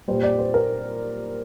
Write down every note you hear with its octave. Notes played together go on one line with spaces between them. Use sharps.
A#2 G3 C5
D5
C5
A#4